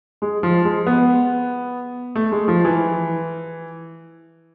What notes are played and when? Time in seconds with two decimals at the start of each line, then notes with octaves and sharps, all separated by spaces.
0.22 G#3
0.43 F3
0.65 G#3
0.87 B3
2.15 A3
2.32 G#3
2.48 F3
2.65 E3